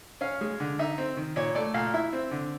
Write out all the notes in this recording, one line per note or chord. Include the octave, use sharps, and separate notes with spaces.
C#4 F5
G#3
D3
D#4 E5
C4
D#3
A#2 C#5
A3 D5
A#2 F5
E4 E5
C4
D3